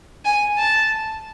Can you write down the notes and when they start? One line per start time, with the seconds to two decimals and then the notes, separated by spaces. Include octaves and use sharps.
0.25 G#5
0.59 A5